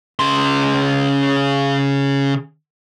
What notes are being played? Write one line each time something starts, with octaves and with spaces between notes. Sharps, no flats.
C#3 C6